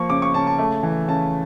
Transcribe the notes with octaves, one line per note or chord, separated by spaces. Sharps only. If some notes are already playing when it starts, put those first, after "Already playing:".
Already playing: F3 A#3 C#6
C#3 D6
C#6
C#3 A5
A5
A3
E3
C#3 A5